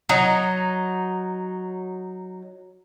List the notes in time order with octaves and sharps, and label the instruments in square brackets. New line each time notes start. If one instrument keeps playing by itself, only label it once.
[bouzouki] F#3 D#4